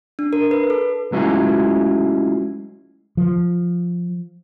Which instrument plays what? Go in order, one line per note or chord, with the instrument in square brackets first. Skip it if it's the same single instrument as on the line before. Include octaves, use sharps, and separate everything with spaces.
[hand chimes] D4
A#4
B4
A4
[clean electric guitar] F#3 G#3 A3 C#4 E4 F4
[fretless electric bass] F3